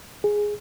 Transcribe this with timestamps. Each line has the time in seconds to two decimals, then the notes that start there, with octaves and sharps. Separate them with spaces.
0.24 G#4